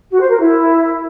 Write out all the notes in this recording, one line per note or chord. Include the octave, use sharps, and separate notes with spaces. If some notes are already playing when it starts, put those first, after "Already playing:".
F#4
C5
A#4
E4